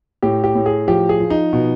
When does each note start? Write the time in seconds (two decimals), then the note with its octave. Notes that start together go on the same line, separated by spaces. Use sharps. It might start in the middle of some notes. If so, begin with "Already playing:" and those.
0.22 A2 G4
0.44 G4
0.55 A2
0.66 G#4
0.88 F3 G4
1.09 G#4
1.20 F3
1.30 D#4
1.53 B2